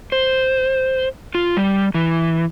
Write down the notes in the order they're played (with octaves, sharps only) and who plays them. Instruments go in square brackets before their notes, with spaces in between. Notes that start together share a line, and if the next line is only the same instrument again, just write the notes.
[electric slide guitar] C5
F4
G3
E3